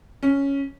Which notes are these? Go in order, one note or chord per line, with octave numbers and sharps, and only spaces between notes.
C#4